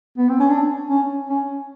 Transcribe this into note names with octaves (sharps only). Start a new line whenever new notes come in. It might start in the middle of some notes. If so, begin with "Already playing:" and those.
B3
C4
C#4
D4
C#4
C#4